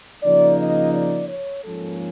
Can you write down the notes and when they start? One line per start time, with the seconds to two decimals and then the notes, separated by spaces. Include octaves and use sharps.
0.23 C#3 F3 A#3 D#4 D5
0.58 D#5
0.94 D5
1.29 C#5
1.64 G#2 F3 A#3 C#4 A4